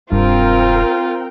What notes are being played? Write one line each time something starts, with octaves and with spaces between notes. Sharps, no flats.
E1 G2 C4 F4 A#4 G5